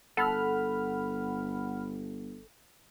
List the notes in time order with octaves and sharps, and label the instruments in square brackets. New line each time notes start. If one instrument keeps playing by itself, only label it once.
[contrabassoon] G1 [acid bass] A4 [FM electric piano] F#5 B5 F6